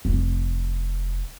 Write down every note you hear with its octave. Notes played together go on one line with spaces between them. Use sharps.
F1